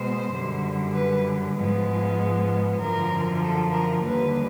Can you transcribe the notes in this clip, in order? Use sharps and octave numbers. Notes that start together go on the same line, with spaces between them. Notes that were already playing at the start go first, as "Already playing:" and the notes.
Already playing: B2 G#3 B3 C5
F#2 D3 G3
B4
G#2 F3 G#3 B3
F#2 D3 F3 A#4
A4
A#4
D#2 D3 G3 B4